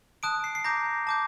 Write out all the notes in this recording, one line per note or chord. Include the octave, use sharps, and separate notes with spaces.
A5 D#6 F#6 D7
C7
C7
A#5 D6 G6 A#6
A5 D6 G6